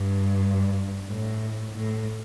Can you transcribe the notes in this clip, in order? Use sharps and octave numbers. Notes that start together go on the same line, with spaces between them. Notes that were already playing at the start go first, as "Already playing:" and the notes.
Already playing: G2
A2
A2